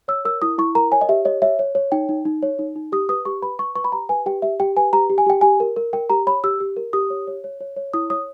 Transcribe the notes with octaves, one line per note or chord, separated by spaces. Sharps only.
C#5 E6
A#4 E6
E4 D#6
E4 C#6
A#4 A#5
C#5 G#5
D#5
G4 E5
C#5 D#5
C#5 E5
C#5
C#5
D#4 G5
D#4
D#4
C#5
D#4
D#4
G4 D#6
B4 D#6
G4 C#6
B4 B5
B4 C#6
B4 C#6
B5
G4 A#5
B4 G#5
G4 G5
G4 E5
G4 G5
B4 G#5
G4 A#5
G4
G#5
G4 G5
G4 G#5
A#4
A#4
A#4 G5
G4 A#5
C#5 B5
G4 E6
G4
A#4
G4 D#6
C#5
C#5
C#5
C#5
C#5
E4 D#6
C#5 D#6